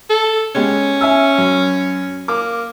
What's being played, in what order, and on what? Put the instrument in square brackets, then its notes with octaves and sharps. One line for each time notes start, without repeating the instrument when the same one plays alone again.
[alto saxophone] A4
[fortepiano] G#3 B3 G4 [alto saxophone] C#4
[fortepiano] E5 G#5 E6
F#2
[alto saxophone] A#3 [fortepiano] D6